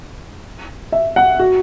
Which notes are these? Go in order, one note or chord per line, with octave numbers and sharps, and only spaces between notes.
E5
F#5
F#4